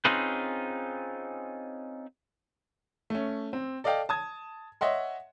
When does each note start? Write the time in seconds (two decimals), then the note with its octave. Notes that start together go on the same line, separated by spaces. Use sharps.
0.05 C4 C#4 D#4 F4 G#4 B4
3.10 A3 C#4
3.53 C4
3.84 A4 D5 D#5 F5 G5
4.09 A5 D#6 G#6
4.81 C#5 D#5 E5 F#5 C6